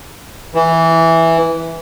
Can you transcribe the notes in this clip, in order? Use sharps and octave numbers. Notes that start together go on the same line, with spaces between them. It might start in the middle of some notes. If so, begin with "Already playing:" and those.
E3